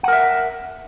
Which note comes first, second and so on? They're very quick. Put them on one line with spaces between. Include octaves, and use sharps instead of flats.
F#5 A#4 E5